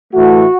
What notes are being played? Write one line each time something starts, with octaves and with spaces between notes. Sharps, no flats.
A2 E3 A3 F#4